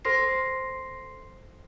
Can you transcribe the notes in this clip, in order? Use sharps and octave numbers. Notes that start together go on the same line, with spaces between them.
A4 C5 C6 A#6 C7